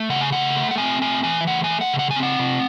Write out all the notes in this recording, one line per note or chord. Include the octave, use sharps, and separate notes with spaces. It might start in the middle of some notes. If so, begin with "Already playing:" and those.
Already playing: A3
C#3 F#5
G#5
A3 F#5
A3
F#5
C4 G#5
A3 G#5
E3 G#5
E5
A3 F#5
G#5
A3
F#5
C#3
F#5
G#5
C4
F#5
C3